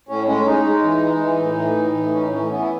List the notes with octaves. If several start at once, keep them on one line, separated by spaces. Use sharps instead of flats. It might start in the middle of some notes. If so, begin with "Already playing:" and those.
A2 C#4
G#3 C#4
G#3 D#4
G#3
E3
G#3
E3
A2
E3
A2
E3
A2 C#4
E3 C#4
E3 B3
E4